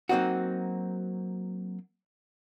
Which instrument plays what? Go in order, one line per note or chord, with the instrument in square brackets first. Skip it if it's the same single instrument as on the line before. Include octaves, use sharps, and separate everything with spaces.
[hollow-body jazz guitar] F#3 A#3 C4 D#4 F#4